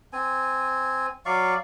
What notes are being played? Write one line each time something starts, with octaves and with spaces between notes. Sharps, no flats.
C4 G#5
F#3 D5 F5 C#6